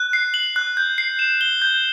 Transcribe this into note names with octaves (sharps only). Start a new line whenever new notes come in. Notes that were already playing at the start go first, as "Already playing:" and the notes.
Already playing: F#6
C7
F#7
F#6
G6
C7
E7
G7
G6